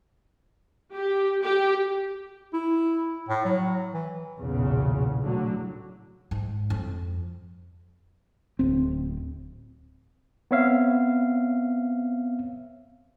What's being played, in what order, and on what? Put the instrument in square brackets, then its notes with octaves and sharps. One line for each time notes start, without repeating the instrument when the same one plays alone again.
[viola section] G4
G4
[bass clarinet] E4
A2
F#3
E3
[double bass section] B1 E2 A#2 C#3
A2 D3 F#3
[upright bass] G#2
F2
[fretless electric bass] D1 C4
[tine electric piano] B3 C4 C#5 E5 F5